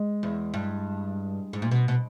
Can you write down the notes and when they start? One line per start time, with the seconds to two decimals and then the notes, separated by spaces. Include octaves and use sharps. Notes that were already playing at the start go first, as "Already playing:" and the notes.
Already playing: G#3
0.23 E2
0.54 G2
1.53 G#2
1.62 A#2
1.71 B2
1.88 B2